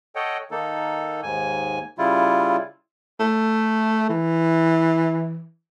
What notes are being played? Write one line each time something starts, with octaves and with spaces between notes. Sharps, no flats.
A4 C#5 D#5 F#5 G5
D#3 A#3 D#4 A4
D#2 G#2 G#5
C#3 G3 E4 F4
A3
E3